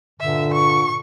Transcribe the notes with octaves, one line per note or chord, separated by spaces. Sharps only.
G2 A#2 D3 E5
C#6